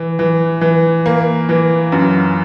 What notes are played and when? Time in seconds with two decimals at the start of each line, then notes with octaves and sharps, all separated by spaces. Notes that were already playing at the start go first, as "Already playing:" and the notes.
Already playing: E3
0.19 E3
0.61 E3
1.06 A#3
1.49 E3
1.92 F#2